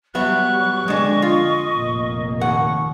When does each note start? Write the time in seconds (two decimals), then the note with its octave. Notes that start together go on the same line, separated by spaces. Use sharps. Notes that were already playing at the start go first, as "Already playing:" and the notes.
0.15 F#3 G3 B3 E5 C#6 F#6
0.88 F2 D3 G#3 D4 D#5
1.22 F4
1.72 F1 A#2 A#3
2.41 D#2 F#5 C#6